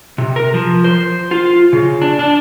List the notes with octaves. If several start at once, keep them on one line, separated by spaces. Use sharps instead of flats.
C3
A#4
F3
C5
F4
C#3
D4
D4